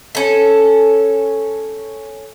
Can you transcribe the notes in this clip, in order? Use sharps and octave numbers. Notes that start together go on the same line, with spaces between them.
C#4 A4